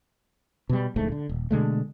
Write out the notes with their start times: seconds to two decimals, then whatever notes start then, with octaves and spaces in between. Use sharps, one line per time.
0.69 B2 G3
0.96 D1 A#1 G#2 A3
1.12 D3
1.29 D#1
1.51 B2 D3 G#3 A3